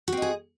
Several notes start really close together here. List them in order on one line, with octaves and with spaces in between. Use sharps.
F#4 C4 D#5 G#4